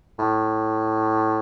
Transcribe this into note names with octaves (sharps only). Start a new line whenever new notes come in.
A2